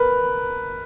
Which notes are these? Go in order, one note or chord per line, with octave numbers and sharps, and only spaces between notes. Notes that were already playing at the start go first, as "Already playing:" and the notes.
Already playing: A#4 B4